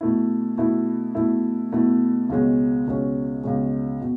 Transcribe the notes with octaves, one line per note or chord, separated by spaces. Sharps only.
B2 A3 E4
B2 A3 E4
B2 A3 E4
B2 A3 E4
C#2 B2 G#3 C#4
C#2 B2 G#3 C#4
C#2 B2 G#3 C#4
B2